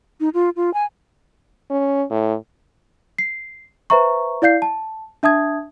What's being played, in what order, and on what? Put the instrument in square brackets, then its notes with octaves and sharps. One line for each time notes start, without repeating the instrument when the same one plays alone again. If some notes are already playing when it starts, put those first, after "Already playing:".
[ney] D#4
F4
F4
G#5
[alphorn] C#4
A2
[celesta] C7
B4 C5 E5 A#5 C#6
E4 D5 F5 G6 C7
A5
D4 E5 A5 D#6 G#6